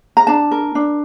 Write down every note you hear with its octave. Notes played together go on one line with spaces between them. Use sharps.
A#5
D4 A5
A#4
D4